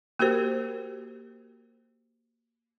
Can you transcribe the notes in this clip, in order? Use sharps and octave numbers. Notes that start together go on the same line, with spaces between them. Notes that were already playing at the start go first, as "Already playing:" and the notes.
A#3 F#4 G4 A#4 C5